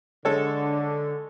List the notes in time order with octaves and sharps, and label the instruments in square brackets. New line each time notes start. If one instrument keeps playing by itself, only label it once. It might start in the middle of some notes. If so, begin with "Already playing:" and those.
[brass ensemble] D3 [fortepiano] G#3 A4 C#5